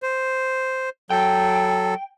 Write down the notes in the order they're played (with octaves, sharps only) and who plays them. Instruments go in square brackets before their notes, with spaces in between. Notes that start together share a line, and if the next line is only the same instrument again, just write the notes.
[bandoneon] C5
[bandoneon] F#3 A4 [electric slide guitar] G5